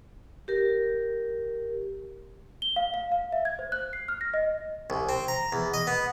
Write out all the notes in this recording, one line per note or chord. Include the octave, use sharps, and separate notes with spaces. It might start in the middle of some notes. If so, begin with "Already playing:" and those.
G4 A#4
G7
F5
F5
F5
E5
G#6
C5
F#6
C7
F6
A#6
D#5
C2
C4
A#5
E2
D#5
B3